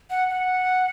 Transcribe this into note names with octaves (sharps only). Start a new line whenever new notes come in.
F#5
F#5